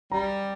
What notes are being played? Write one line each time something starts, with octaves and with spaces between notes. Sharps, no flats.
G3 A#5